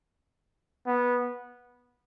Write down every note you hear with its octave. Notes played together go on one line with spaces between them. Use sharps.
B3